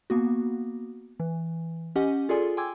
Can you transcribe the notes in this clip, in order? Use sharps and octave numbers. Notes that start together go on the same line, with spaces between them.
A#3 B3 F#4
E3
C#4 G4 D#5 F#5 G#5
F4 G#4 A4 D5 G#5 C6
G5 G#5 C6 D6 E6 G#6